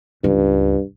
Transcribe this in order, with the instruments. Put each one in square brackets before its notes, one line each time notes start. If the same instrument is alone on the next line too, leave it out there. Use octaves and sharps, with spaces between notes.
[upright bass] C#2 [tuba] G2